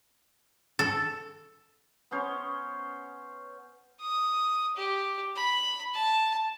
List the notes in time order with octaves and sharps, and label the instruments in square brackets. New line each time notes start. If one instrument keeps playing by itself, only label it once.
[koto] A4
[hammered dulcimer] B3 C#4 C5 C#5
[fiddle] D#6
G4
B5
A5